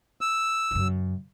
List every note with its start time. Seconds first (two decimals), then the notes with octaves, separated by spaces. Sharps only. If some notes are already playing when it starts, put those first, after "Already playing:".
0.21 E6
0.71 F#2 C#3